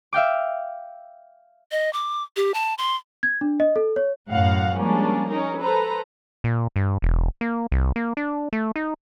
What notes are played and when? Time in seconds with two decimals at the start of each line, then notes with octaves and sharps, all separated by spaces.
0.13 E5 F5 G5 D6
1.72 D#5
1.93 D6
2.36 G4
2.54 A5
2.78 C6
3.23 G#6
3.41 D4
3.60 D#5
3.76 A4
3.96 C#5
4.31 F#2 A2 F5 F#5
4.77 F3 G3 G#3 A#3 C#4 D4
5.30 C#4 D#4 A#4
5.59 A4 B4 C5 A#5
6.44 A#2
6.76 G2
7.02 E1
7.41 A#3
7.72 C2
7.96 A#3
8.17 D4
8.53 A3
8.76 D#4